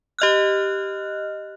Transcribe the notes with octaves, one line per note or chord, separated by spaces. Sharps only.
G4 D#5 F6 F#6